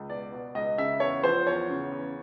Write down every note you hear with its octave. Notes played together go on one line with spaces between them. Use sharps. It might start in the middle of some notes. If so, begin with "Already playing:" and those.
Already playing: C#2
B2 D5
B2
C#2 D#5
C#3 E5
E2 C#5
F3 C5
E2 C#5
C#3
E2